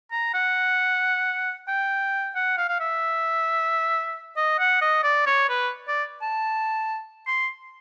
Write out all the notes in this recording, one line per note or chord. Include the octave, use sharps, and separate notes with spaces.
A#5
F#5
G5
F#5
F5
F5
E5
D#5
F#5
D#5
D5
C#5
B4
D5
A5
C6